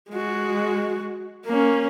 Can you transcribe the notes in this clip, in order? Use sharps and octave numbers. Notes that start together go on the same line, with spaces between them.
G#3 F#4
A#3 C#4